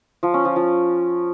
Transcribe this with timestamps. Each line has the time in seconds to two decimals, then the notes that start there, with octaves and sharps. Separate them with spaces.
0.23 F3
0.34 C#4
0.45 F3
0.56 F3